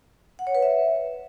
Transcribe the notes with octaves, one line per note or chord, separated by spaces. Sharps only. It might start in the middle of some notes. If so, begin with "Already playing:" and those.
F#5
C#5
B4
E5